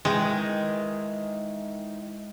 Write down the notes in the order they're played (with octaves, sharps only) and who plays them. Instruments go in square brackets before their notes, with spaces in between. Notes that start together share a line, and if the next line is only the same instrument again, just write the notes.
[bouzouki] D#3 E3 [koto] G#3